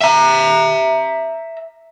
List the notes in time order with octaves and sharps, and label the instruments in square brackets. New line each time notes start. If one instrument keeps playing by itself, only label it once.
[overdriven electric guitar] E5 A#5